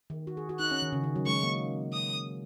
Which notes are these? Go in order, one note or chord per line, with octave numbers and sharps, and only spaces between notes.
D#3
F#4
G#4
F#4
D#4 F#6
C#4
D#3
C#3
D#3
F#3
G#3 C#6
A#3
D#6